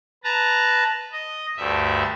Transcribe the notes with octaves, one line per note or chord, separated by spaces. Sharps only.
B4 A5 A#5
D#5
D2 G2 E5